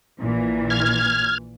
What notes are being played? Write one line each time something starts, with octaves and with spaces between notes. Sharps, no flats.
A#1 A#2 E3
F6 G#6